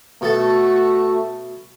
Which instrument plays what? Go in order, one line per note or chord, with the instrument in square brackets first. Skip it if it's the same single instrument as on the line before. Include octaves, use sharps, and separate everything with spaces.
[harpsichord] B2 A4 [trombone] A3 [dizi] F#4